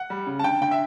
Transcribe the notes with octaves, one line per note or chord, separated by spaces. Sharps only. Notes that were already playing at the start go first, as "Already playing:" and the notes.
Already playing: F#5
G3
C#3
A5
D3 G5
D3 G5
E5